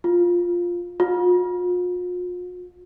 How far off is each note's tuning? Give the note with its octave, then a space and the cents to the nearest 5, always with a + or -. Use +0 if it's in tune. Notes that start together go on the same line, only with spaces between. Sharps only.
F4 +5
F4 +45